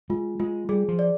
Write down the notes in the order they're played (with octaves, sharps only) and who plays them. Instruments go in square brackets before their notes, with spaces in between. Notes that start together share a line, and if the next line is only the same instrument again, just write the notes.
[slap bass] G#3 [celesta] F4
[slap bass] G#3 [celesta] F4
[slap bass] G3 [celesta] G#4
[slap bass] F3
[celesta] D5